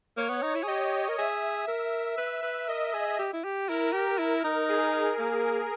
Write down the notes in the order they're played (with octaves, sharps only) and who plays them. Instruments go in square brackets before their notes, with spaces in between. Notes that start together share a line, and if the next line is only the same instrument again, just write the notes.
[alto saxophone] A#3 [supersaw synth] C#5
[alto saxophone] B3
D#4
E4
G#4
[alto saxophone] G4 [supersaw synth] D#5
[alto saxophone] A#4
[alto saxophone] G#4 [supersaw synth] E5
[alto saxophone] A#4
B4
B4
[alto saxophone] A#4 [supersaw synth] D#5
[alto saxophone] G#4
G4
E4
G4
[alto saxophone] E4 [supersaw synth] A#4
[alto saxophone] G4
E4
D#4
[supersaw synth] G#4
[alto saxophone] A#3